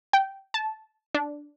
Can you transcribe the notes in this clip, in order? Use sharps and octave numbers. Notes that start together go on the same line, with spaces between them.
G5
A5
D4